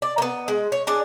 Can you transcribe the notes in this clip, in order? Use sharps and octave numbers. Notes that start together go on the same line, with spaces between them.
D5
A#3 B3
G#3
C#5
D4 G#4 D5